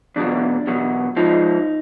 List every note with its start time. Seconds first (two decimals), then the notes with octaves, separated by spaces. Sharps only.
0.16 E2 B2 F#3 D4
0.67 E2 B2 F#3
1.16 G#2 F3 D#4